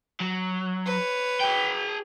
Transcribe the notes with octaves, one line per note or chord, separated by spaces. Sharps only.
F#3
B4 C#5
G#4 G5